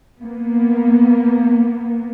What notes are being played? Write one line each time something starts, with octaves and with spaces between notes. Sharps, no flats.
A#3 B3